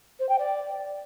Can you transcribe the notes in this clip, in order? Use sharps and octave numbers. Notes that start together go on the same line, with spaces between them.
C5
G5
D5